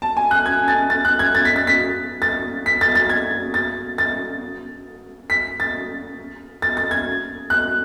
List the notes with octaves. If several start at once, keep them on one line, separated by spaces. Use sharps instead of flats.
A5
G#5
F#6
G#6
A6
A6
F#6
G#6
A6
B6
A6
B6
A6
B6
A6
A6
G#6
A6
A6
B6
A6
A6
A6
G#6
F#6